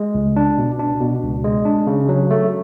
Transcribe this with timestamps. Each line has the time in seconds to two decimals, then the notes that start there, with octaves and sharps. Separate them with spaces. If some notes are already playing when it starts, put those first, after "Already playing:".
Already playing: G#3
0.15 C#2
0.36 D4
0.58 B2
0.80 D4
1.01 B2
1.23 C#2
1.44 G#3
1.65 D4
1.87 C#3
2.09 F#3
2.30 A3